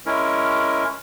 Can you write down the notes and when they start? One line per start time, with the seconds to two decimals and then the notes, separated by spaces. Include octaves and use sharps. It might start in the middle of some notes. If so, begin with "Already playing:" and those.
0.06 G#3 C#4 E4 A#4